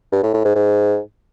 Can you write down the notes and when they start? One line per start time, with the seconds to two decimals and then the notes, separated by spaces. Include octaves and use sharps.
0.12 G2
0.23 A2
0.34 A2
0.44 G#2
0.55 G#2